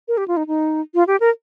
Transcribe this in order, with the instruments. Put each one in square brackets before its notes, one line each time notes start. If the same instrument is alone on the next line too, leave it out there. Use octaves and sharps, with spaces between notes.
[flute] A#4
G4
F4
D#4
D#4
F4
G4
A#4